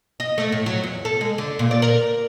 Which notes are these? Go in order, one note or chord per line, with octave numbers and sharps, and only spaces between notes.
D#5
A3
A2
F#3
E2
A4
G#3
D3
A#2
D5
A#4